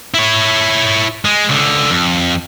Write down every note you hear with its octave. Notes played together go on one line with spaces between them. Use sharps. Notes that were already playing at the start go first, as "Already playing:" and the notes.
E4 C#5
G#3
C#2 D3
F2